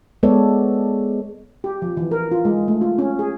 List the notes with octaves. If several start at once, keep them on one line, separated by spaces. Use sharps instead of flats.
G#3 B3 A4 C#5 D5
G4
F3
E3
A#4
F4
G#3
A3
F4
C#4
G#4